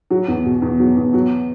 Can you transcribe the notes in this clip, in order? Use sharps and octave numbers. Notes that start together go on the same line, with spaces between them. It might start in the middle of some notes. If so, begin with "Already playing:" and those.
F#3
E2
B2
E2
F#3
E2
F#3